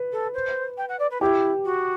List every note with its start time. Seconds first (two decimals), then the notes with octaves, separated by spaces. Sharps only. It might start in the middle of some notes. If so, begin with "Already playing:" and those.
Already playing: B4
0.12 A4
0.34 C5
0.77 G5
0.88 F#5
0.99 D5
1.10 B4
1.21 E4 G4
1.65 F#4